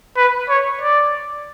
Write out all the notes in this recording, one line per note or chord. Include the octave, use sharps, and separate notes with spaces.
B4
C#5
D5